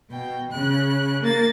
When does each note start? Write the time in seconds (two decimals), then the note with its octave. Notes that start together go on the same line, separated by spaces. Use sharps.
0.10 B2 G5
0.51 C#3 F#6
1.21 A#3 A6